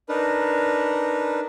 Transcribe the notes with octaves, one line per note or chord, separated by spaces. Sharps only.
D4 D#4 A#4 B4